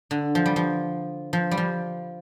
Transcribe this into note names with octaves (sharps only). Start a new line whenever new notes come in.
D3
F3
G3
F3
F3
G3
F3